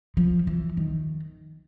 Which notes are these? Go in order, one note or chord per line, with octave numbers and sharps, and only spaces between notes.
F3
E3
D#3